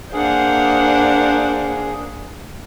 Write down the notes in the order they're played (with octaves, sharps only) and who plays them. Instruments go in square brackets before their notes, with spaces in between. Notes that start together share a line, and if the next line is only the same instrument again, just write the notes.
[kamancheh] A#3 D4 [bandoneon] G#4 [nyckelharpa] C5 F#5